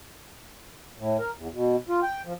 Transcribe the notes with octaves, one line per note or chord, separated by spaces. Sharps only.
A2
A#4
E2
B2
F4
G5
F3